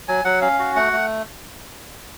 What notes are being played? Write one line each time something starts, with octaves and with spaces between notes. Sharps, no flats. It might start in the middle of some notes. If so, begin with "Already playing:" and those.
F#3 G#5
F#3 F#5
C#4 F5
F#4
A3 F#5
A3